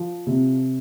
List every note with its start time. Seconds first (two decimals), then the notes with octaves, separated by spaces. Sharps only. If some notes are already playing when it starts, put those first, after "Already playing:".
Already playing: F3
0.27 C3